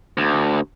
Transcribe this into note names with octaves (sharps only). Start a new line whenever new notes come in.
D2